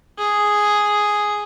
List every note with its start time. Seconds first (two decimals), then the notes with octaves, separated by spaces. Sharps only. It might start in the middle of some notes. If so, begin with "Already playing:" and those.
0.18 G#4